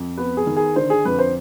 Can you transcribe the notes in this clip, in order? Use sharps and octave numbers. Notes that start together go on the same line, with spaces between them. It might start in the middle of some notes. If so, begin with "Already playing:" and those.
Already playing: F2
B3 B4
G#4
D#3
G#4
D3 C5
G#4
F2 B4
C5